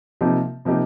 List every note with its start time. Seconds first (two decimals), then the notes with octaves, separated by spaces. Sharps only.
0.21 C3 F3 A#3 D#4 G4
0.65 C3 F3 A#3 D#4 G4